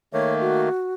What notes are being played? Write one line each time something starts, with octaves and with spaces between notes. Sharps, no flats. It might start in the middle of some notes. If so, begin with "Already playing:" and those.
D#3 A3 A#3 C#5
F#4